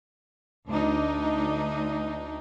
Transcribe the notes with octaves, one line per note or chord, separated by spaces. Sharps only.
D2 D4 D#4